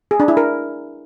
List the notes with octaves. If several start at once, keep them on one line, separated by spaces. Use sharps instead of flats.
G#4
D4
E4
A#4